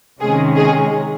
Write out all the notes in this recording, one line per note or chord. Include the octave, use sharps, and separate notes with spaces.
C3 D#3 G#3 C#4 G#4
G#4